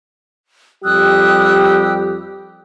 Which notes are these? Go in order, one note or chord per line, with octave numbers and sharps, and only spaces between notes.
F2 G3 G4 D#6 E6 F#6